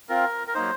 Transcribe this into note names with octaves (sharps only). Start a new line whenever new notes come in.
C4 F4 A#4
A#4
F#3 A#3 D#4 C5